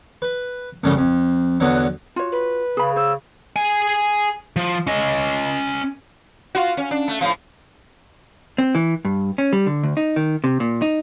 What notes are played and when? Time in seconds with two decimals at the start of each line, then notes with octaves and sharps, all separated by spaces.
0.22 B4
0.84 A1 F#2 C#3 G3 A3
0.97 F2
1.60 E2 D3 F#3 B3
2.16 F4 F#4 C#5
2.32 B4
2.77 C#3 G#4 B5
2.96 C5 E6
3.56 G#4 G#5
4.56 F3
4.87 C#4 D#5
6.55 F4 F#4
6.77 C#4
6.91 D4
7.08 A3
7.21 A2 C#3 F3
8.58 C4
8.75 E3
9.05 G2
9.38 C#4
9.53 G3
9.66 D3
9.83 D2
9.97 D#4
10.16 D#3
10.44 C3
10.60 A#2
10.82 D#4